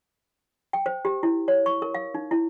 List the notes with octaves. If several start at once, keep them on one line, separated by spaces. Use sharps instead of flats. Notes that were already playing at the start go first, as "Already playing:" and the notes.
G5
C5
G4
E4
C#5
C#6
A#4
F5
D#4
E4